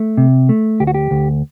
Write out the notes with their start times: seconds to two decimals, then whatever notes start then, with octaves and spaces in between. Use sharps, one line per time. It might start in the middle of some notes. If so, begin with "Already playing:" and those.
Already playing: A3
0.17 C3
0.49 A3
0.80 D2 G4
0.87 F#4
0.94 G4
1.11 D2